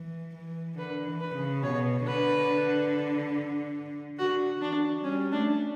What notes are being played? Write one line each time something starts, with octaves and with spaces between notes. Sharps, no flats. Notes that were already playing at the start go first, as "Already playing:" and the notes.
Already playing: E3
E3
D3 B4
E3
B4
C#3
B2 C#5
D3 B4
D3 F#4
E3 D4
G3 C#4
A3 D4